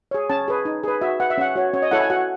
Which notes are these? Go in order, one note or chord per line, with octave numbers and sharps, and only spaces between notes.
G#4 C#5
C#4 A5
G#4 B4
D#4
G#4 B4
F#4 E5
B4 F#5
E5
C#4 F#5
F#4 C#5
C#4 C#5
D#5
E4 A4 C#5 F#5
G#5
F#4 F#5